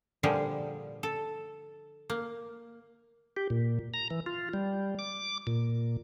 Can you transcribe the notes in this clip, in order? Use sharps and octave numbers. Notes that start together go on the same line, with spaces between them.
A#2 D3 F3 G3 G#4
A4
A#3
G4
A#2
A#5
E3
F4
G3
D6
A#2